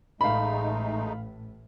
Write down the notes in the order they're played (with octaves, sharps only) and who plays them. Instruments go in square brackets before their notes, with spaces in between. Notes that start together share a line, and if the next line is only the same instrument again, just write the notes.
[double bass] A1 A2 [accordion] G#3 A3 D#4 [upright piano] F5 B5